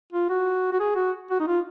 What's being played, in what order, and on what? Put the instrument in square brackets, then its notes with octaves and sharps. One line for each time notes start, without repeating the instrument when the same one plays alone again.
[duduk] F4
F#4
F#4
G#4
F#4
F#4
D#4
F4